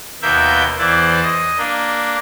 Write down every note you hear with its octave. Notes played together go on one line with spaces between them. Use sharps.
D#2 B2 A#3 E5 G5 G6
E2 E3 E4 C5 D5
D#5
A#3 D4